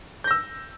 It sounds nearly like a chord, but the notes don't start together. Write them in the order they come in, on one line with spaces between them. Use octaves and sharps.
G6 A#6 E6